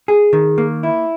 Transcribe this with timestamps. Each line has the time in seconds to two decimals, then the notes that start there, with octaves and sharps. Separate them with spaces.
0.08 G#4
0.33 D#3
0.58 A#3
0.83 E4